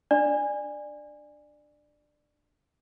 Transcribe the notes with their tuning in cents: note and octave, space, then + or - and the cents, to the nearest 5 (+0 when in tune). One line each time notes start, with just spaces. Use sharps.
D4 +10 D5 +20